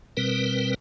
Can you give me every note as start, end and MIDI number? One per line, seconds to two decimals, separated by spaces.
0.17 0.74 47
0.17 0.74 55
0.17 0.74 60
0.17 0.74 70
0.17 0.74 71